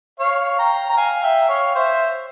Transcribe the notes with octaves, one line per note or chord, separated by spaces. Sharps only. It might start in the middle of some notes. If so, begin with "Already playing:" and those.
C#5 F5
G5 A#5
A#5
F5 G#5
E5 G5
C#5 F5
C5 E5